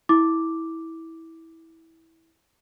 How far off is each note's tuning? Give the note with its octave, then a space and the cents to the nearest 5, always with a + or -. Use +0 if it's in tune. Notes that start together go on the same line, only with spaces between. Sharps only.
E4 -15 D6 +0